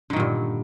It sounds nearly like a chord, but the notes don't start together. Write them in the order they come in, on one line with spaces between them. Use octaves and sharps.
D3 D#3 A#2 G2